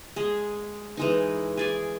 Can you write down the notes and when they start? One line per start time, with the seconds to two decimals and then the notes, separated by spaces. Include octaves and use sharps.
0.16 G#3 G#4
0.97 E3 G#3 D#4
1.57 G#4 D5 G#5